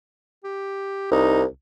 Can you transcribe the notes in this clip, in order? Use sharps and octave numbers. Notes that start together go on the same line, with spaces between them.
G4
C2 D#4